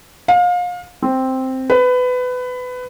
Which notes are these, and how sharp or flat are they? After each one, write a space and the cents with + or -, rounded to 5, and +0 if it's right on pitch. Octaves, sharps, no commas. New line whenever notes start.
F5 +30
C4 +0
B4 +20